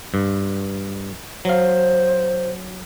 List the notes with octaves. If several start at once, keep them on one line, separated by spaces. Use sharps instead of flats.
G2
F#3 C5 F5